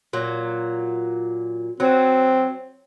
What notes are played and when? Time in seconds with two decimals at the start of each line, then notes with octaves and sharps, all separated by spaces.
0.13 A#2 F#3
1.80 F#3 C4